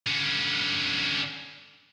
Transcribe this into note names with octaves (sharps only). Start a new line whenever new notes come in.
D3 C#4